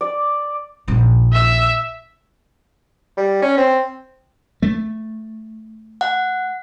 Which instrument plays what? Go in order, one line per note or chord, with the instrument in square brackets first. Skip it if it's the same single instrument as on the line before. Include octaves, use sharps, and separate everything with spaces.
[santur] D5
[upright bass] A#1 D#4
[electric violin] E5
[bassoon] G3
C#4
C4
[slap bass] A3
[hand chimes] F#5